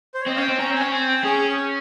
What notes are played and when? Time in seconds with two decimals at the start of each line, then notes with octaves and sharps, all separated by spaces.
0.14 C5
0.21 C#5
0.26 C4 D#5
0.36 C#4 F5
0.42 G5
0.48 C4
0.59 C#4 A#5
0.71 C4 G#5
0.81 C#4
0.91 C4 G#5
1.08 G5
1.24 C#4 G#4